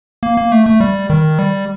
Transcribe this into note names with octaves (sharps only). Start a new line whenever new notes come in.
A#3
A#3
A3
A3
G3
D#3
G3